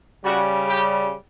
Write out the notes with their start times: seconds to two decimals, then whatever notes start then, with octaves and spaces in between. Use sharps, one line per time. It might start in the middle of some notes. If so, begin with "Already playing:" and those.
0.24 C#3 G3 F#4
0.68 G4